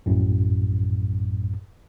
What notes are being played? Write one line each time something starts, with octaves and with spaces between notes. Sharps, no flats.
A#1 F#2 A2